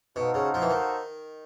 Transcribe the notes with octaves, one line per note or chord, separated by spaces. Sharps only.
B2 D#4 F#4 A4 C5 F5
C#3
F3
E3
D#3